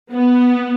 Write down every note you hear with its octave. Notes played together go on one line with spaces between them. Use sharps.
B3